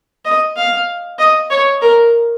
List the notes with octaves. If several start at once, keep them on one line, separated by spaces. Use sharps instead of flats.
D#5
F5
D#5
C#5
A#4